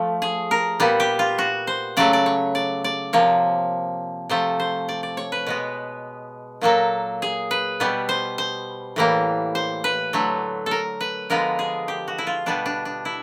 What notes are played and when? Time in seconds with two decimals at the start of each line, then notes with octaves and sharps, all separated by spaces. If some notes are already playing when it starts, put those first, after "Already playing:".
Already playing: F3 A3
0.22 G#4
0.51 A#4
0.80 A#2 G3 B3
1.00 G4
1.19 F4
1.38 F#4
1.67 C5
1.97 C#3 F#3 A3 D5
2.13 D5
2.26 C#5
2.55 D5
2.84 D5
3.13 C3 F3 A#3 C#5
4.29 C3 F3 A3 C5
4.60 C5
4.89 D5
5.03 D5
5.17 C#5
5.32 B4
5.47 B2 G#3 B3
6.61 A#2 F#3 A#3 A4
7.22 G#4
7.51 B4
7.80 B2 G3 B3
8.09 C5
8.38 C5
8.96 A2 E3 G3 A#3
9.55 C5
9.84 B4
10.13 D3 F#3 A3
10.66 A4 A#4
11.01 B4
11.30 D3 F3 G#3 B3 A#4
11.59 G#4
11.88 G4
12.08 F#4
12.18 E4
12.27 F4
12.46 B2 G3 B3 D4
12.66 D4
12.85 D4
13.05 E4